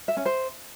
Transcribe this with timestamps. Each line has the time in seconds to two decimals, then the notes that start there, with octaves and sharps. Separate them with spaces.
0.08 E5
0.17 C#4
0.26 C5